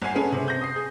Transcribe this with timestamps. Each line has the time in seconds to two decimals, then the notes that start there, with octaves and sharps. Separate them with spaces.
0.02 G1 F#5 G#5 C7
0.15 C#4 G#4 A4 B4
0.32 C3
0.48 G6 A#6
0.61 D#6 C7
0.76 G#4